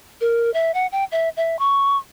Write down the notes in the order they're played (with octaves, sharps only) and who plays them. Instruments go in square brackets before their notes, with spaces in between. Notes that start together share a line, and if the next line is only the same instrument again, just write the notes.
[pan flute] A#4
E5
F#5
G5
E5
E5
C#6